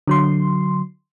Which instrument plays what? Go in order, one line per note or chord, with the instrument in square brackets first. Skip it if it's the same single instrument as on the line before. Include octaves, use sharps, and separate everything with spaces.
[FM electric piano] D3 F#3 C6